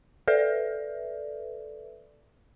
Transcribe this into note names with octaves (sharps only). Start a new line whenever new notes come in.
A4 B4 D5 E5